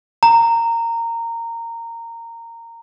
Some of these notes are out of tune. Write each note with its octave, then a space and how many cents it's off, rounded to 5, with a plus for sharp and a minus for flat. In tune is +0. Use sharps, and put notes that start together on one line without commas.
A#5 -15